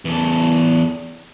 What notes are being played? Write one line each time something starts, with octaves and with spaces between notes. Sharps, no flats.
E2 A4